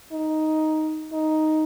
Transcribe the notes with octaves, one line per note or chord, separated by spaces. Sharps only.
D#4
D#4